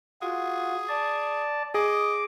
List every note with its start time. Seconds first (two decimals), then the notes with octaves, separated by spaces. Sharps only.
0.22 F4 F#4 G#4
0.89 D5 A5
1.74 G#4 D#5 D6